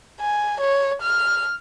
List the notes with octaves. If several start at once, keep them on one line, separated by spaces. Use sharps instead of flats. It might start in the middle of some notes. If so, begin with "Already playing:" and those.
G#5
C#5
F6